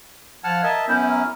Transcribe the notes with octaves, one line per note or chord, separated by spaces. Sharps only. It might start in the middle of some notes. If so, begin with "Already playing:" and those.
F3 F5 F#5 A5 F6 G#6
A#4 D#5 E5 A5
F#2 B3 C#4 E4 A#4 E5 G6
A#5 F6